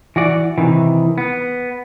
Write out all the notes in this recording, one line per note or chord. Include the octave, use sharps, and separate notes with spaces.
E3 F#4 D5
C3 D#3 E3
B3